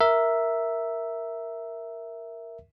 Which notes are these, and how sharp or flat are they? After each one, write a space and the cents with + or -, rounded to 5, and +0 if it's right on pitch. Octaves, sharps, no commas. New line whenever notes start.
A#4 +0 E5 +0